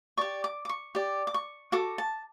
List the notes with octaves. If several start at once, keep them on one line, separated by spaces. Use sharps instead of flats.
G4 D5 C#6
D6
D6
C#6
G4 D5
D6
C#6
F#4 A4 D6
A5